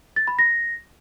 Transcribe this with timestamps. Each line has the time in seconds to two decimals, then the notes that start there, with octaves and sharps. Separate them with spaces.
0.16 A6
0.27 B5
0.39 A#6